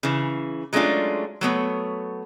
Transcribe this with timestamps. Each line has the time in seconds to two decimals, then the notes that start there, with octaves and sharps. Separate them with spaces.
0.03 C#3 E3
0.73 F#3 G#3 A3 C#4 D4 F4
1.41 F#3 A3 B3 C#5